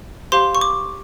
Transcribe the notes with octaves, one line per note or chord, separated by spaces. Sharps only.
G4 C5 F5 C6
C#6
D6